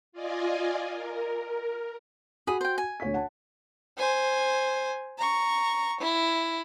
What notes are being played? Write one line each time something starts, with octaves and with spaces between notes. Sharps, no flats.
F4 D5 D#5 G#5
A#4
F#4 G#4 B5 D#6
C5 G5
G#5
D2 C#5 B6
F#5 A5
C5 G#5
A#5 C#6
E4